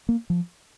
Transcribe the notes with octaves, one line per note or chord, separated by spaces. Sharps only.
A#3
F3